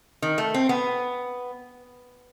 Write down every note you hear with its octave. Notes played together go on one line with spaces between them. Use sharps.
D#3
A3
C4
B3